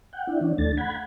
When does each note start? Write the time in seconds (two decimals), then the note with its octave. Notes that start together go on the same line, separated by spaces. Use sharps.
0.13 F#5 G5
0.27 D4 E4
0.41 E3 C#4 D4
0.58 D#2 A3 D4 A6
0.77 F#5 B5 G#6